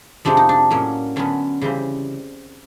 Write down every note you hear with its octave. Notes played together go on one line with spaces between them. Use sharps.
F2 C3 F3 G#3 C4 D4
D#4
D4
A2 F#3 A#3 C#4
D3 F#3 B3 C#4
C#3 E3 G3 C4